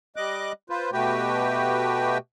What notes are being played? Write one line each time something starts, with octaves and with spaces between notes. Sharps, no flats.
G3 D#5 D6 F#6
F4 B4 C5
B2 A3 F#4 G4 B4 G5